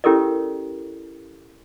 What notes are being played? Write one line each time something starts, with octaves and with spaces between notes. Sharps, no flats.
C#4 E4 G4 A4 A#4 D5